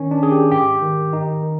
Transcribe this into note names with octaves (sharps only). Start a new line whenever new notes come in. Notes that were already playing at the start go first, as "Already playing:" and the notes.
Already playing: D#3 C#4
D4
D#3 G#4
G4
G#2 G4
D#3
D#3 D#4
D#3